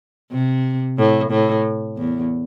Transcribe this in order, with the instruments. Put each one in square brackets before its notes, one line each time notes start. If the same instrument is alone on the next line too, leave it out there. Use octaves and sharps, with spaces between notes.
[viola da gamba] C3
A2
A2
E2